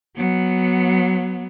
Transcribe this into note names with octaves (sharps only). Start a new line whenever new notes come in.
F#3 B3